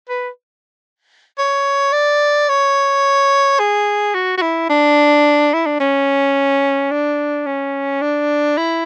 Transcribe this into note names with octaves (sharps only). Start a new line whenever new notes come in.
B4
C#5
D5
C#5
G#4
F#4
F#4
E4
D4
E4
D4
C#4
D4
C#4
D4
E4